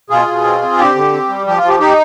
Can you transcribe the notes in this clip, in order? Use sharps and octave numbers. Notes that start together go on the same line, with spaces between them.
B2 F4 G#4
B2
C4
C4
D3 G4
D3
C4
G3
F3 G4
F4
F3
G4
D#4 G4